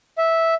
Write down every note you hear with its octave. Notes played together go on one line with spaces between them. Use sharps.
E5